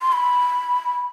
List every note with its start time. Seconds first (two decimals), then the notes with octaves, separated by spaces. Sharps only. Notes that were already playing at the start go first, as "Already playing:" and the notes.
0.02 C6
0.12 B5